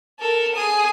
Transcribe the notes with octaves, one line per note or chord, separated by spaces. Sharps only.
A4 A#4
G#4 D#6